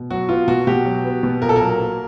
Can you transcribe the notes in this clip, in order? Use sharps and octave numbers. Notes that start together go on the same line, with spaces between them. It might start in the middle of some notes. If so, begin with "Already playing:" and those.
Already playing: B2
F#3 F#4
B3 F4
B2 F#4
B2 G4
F#3
B3
B2
A#2 A#4
A4
F#3 A#4
A#3